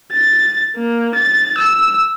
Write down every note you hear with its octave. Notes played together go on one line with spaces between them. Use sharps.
A6
A#3
A6
E6